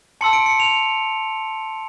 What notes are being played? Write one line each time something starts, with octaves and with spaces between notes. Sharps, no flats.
A5 C6 E6 C#7
D7
C#7
F7